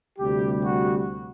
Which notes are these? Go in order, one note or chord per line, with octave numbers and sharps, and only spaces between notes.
D2 C3 G3 G4
F#4